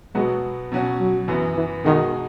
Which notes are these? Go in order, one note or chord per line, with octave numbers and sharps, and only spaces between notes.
B2 F#3 G#3 B3 F#4
B2 F#3 C#4 F#4
F#3
F#2 E3 B3
E3
B2 D#3 G#3 D#4 F#4